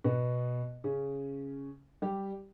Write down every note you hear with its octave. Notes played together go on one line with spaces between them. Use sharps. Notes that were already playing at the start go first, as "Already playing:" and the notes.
B2 B3
C#3 C#4
G3 G4